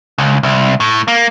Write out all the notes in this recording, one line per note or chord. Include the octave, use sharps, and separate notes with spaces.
C#2
C2
A2
A#3